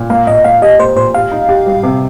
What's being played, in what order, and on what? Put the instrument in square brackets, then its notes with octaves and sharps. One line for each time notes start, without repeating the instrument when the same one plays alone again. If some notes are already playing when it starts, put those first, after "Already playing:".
Already playing: [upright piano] A#2
[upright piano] A#3 [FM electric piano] F5
[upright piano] A#2 [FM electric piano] D#5
[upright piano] A#3 [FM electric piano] F5
[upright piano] G4 [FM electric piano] D#5
[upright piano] A#3 [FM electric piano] C5
[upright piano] A#2 [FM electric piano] C5
[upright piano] G4 [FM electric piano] F5
[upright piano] D#4
G4
G3
C3